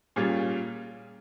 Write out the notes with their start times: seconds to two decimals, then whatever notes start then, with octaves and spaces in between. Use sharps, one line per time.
0.16 A#2 G3 C#4 F4 G#4